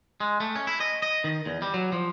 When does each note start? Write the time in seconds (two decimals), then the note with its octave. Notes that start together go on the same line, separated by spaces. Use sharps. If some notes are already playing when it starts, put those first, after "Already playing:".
0.20 G#3
0.40 A3
0.56 C#4
0.67 E4
0.80 D#5
1.02 D#5
1.24 D#3
1.46 E2
1.62 G3
1.74 F#3
1.92 F3